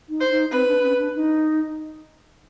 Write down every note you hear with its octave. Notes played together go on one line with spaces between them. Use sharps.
D#4
C5
D#4
C4 B4
D4
C#4
D4
D#4